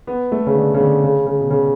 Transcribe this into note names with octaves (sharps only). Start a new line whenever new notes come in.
B3
A3
C#3
D3
C#3
D3
C#3
C#3
B2
C#3